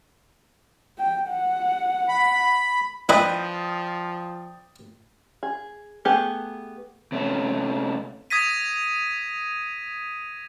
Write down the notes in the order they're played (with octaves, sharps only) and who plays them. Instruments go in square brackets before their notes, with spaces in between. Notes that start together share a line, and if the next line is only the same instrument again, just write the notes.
[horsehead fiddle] G5
F#5
[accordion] B5
[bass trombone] F3 [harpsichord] E4 D#5 [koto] B4 [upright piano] D5 G5 D#6
[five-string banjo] G#4
A3 B3 G4 G#4
[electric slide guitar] C3 A3 C#4
[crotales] D#6 G#6 A#6 B6 D#7